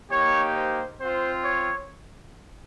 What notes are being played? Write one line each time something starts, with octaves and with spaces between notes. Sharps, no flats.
A#3 D#4 G4 C#5
C5
C4 F4 C5
C#5